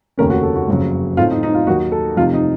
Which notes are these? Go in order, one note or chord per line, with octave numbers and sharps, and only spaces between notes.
F1 D#2 C#3 A3 C#4 A#4
F#4
A4
F#4
F#1 F2 C#3 F#3
A2 A3 C4 D#4 F4
D#4
D#4
F4
D#2 D#3 F#3 A#3 D#4 F#4
A4
F2 C3 F3 A3 D#4 F4
D#4